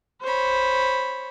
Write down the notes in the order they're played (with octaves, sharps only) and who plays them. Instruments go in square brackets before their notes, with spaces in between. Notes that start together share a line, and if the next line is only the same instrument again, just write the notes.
[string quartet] C5 C#5 B5